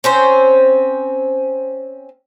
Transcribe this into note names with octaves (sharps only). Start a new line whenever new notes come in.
C4 C#4 C5